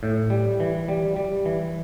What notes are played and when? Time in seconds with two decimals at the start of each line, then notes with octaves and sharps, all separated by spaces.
0.03 A2
0.30 G3
0.60 E3
0.88 G3
1.16 G3
1.45 E3